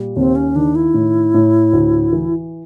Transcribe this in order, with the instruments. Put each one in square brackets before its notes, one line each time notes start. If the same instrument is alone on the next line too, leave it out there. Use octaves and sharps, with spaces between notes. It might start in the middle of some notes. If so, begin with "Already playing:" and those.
Already playing: [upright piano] A#2 G3
[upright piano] D#2 [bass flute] C4
[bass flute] C#4
[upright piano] D#3 [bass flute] D4
[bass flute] E4
[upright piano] A2
A2
D2
E3